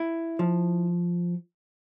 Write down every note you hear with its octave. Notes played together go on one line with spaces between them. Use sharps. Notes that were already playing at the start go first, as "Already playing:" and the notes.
Already playing: E4
F3